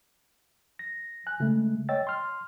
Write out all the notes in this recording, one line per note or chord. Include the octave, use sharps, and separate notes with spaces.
A#6
G#5 F#6
C#3 G#3 A3
C#5 D#5 G5 E6 A6
C6 F6